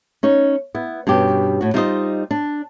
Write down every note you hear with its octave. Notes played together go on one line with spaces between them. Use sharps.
C#4 D#4 C#5
B3 E4
G2 B2 C#4 G4
A2 F#4
G3 D#4 F4 G4 C5 D#5
D4